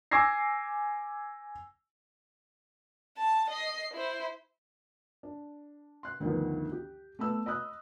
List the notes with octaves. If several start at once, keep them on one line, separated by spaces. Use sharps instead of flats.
G#5 D6 E6 G#6 A#6 C7
A5
D#5 C7
E4 C5
D4
C6 F#6
D2 G2 D#3 F3 B3
G4
A3 B3 B5 E6
D#5 B5 D#6 F#6